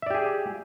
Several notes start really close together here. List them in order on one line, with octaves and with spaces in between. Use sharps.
E5 D5 G4 G#4